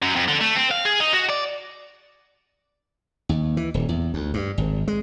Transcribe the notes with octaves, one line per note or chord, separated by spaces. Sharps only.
F#2
F2
D3
A3
C4
F5
G#4
D#4
F#4
D5
D#2
E3
D#1
E2
D2
G2
G#1
G#3